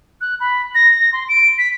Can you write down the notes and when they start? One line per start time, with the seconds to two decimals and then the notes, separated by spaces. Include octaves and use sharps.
0.21 F#6
0.40 B5
0.75 A#6
1.13 C6
1.29 D7
1.58 B6